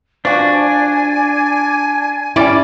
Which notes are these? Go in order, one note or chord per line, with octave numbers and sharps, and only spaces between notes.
F3 D4 F#4 G#5
G3 C#4 E4 D5